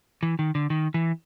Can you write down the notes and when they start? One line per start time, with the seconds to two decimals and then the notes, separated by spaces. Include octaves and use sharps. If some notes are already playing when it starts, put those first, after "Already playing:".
0.23 E3
0.39 D#3
0.55 D3
0.70 D#3
0.94 E3